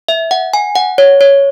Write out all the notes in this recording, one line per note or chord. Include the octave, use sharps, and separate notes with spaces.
E5
F#5
G#5
F#5
C#5
C#5